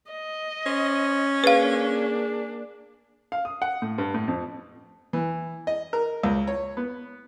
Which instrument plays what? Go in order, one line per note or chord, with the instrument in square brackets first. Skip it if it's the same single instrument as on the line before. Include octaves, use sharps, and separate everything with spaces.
[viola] D#5
[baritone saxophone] C#4 [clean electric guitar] C5
[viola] A#3 D4 [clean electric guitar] G#4 [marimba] B4 F5
[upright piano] F5
D#6
F#5
A2
G2
A2
F2
[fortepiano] E3
D#5
A#4
C#2
C#5
B3